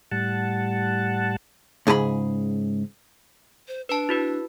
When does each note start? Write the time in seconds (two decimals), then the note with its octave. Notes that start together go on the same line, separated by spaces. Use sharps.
0.11 A2 G3 F#5 A5
1.87 C#2 G#2 G#4 A#5 B5
3.68 C5
3.89 D4 B4 A5
4.09 E4 F#4 B4